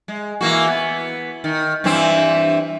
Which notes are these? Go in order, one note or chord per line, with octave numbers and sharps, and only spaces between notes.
G#3
E3 A#3 F#4
B3
D#3
G2 E3 C4